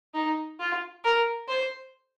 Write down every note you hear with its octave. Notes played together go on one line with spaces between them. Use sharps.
D#4
F4
A#4
C5